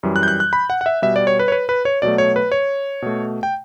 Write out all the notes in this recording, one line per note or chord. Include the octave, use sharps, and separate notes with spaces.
F#2 E3 G3
F#6
G6
F#6
F#6
B5
F#5
F#5
E5
B2 G3 E5
D5
C#5
B4
C#5
B4
B4
C#5
B2 F#3 A3 D5
C#5
B4
C#5
B2 A3
G5